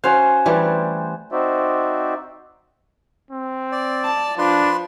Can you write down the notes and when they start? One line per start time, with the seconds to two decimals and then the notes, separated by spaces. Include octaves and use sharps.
0.04 C#4 F#4 C5 F5
0.46 E3 G3 A3
1.32 C4 D#4 F#4 C5 D5 E5
3.31 C4
3.72 D5
4.04 A5
4.39 F3 D4 B4 C6